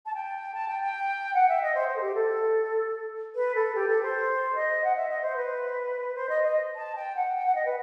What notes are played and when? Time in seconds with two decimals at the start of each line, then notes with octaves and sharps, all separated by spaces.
0.06 A5
0.14 G5
0.54 A5
0.68 G5
0.82 G5
1.34 F#5
1.48 E5
1.62 D#5
1.75 C5
1.88 C5
1.96 A4
2.01 G4
2.15 A4
3.35 B4
3.55 A4
3.75 G4
3.88 A4
4.02 C5
4.55 D#5
4.84 F#5
4.96 E5
5.09 D#5
5.21 C5
5.36 B4
6.15 C5
6.29 D#5
6.43 D#5
6.75 A5
6.95 G5
7.16 F#5
7.35 G5
7.46 F#5
7.55 D#5
7.65 B4